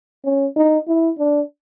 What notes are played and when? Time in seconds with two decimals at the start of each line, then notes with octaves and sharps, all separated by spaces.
0.25 C#4
0.56 D#4
0.88 E4
1.19 D4